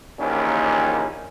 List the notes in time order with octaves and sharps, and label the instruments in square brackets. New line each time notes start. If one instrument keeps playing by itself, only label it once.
[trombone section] A#1 D#2 A#2 D#3 E3 C#4